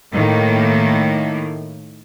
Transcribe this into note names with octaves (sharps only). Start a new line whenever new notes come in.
A2 D#3 A#3